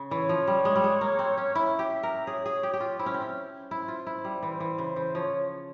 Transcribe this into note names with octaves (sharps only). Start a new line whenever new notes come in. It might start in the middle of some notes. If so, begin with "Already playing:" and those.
Already playing: C#3
E3 C#5
F3
G3
G#3
G3
G#3
A#3
C4
C#4
E4 E5
G4
A#4
G#4 C#5
G#4
G4
G4
F4
E4 C5
C#4
C4
C#4
E4 C5
F4
E4
G3
E3 C5
E3
C#3
E3
F3 C#5